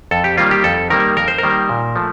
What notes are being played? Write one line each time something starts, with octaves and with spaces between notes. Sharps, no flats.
F2 A4
G4
D#3 G3 A#3 F4
G4
F2 A4
D#3 G3 A#3 A#4
F2 A#4
C5
A#4
D#3 G3 A#3
A#2
F3 A3